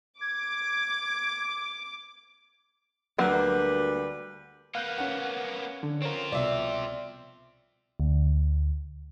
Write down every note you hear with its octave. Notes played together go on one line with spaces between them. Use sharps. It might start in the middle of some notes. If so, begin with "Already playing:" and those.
D6 G#6
D2 F#3 G3 A#3 B4
A#3 B3 F5 F#6 G6
C#4 F#5
D3
C4 F4 A#4 C#5
C2 B2 D5 E5
D2